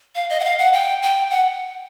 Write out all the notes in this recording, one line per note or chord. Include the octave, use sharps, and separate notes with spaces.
F5
D#5
F#5
F5
F#5
G5
G5
F#5